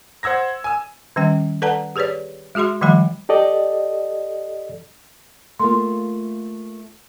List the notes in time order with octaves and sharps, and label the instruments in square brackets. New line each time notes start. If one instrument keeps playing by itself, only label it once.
[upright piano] C5 F#5 E6 G#6 A#6
G#5 E6
[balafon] D#3 G3 C#4 G5
A4 B4 D5 F#5 A5 A#5
G4 G#4 B4 C#5 D5
G#3 F#4 G#4 E5 C6
D#3 F3 G3 A3 G5 B5
[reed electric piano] G4 A4 D5 D#5
[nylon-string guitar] A3 A#3 F4 [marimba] C6